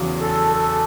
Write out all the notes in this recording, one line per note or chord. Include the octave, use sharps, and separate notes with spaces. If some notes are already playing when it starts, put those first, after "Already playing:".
Already playing: E2 C#3 F#3 C#4
A4
A4